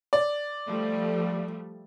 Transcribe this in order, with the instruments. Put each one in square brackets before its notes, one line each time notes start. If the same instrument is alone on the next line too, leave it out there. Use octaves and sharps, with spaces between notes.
[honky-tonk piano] D5
[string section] F3 G3 A3